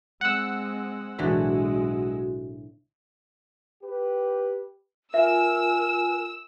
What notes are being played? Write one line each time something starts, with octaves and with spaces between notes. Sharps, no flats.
G#3 C4 F#5 E6
B1 A2 D3 E3 G#3 F#4
G4 B4
F4 A#4 E5 G#5 E6